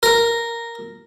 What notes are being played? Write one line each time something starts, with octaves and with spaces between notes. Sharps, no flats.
A#4